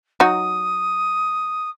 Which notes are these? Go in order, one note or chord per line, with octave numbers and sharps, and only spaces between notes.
F#3 D#4 F#4 D#6